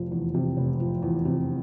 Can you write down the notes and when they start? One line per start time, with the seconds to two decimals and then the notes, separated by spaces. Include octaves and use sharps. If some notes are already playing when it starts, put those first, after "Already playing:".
Already playing: F1 F3
0.11 E2
0.34 C3
0.57 F1
0.80 F3
1.02 E2
1.25 C3